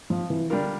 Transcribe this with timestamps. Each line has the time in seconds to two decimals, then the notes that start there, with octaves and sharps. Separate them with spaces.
0.10 F3
0.30 E3
0.50 D3 G3 D4 F4 A#4